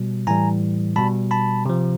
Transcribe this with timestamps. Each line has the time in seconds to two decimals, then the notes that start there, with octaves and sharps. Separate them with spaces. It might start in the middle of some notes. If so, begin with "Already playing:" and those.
Already playing: B2 G3
0.27 A2 E3 G3 G#5 A#5
0.96 B2 G3 A5 B5
1.31 A5 B5
1.66 C3 F3